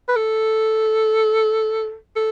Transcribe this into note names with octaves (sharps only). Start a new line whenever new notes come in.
B4
A4
A4